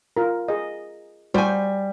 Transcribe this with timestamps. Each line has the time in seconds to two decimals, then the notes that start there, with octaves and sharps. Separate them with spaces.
0.17 F4 A#4
0.48 G#4 D#5
1.34 G3 F#4 C5 G#5